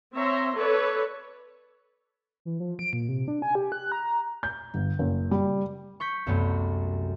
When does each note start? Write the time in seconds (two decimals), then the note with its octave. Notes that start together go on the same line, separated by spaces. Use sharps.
0.14 C4 C#5 E5 A#5 C6
0.57 A4 B4 C#5 D5
2.45 E3
2.60 F3
2.79 D7
2.93 A#2
3.09 C3
3.28 D4
3.42 G#5
3.55 G4
3.72 F#6
3.92 A#5
4.43 G6
4.74 G1
4.99 F#1
5.31 G3
6.00 C#6 G6 B6
6.26 C2 F#2 C3 A3 B3